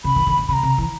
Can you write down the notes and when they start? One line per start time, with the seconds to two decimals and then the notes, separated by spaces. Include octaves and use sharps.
0.04 C#3 B5
0.16 D#3
0.27 D3
0.37 D3
0.48 C#3 B5
0.53 A#5
0.63 C3
0.78 E3